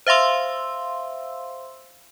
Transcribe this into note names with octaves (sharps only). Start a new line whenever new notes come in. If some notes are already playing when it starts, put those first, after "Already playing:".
C5 E5 F5 C6 E6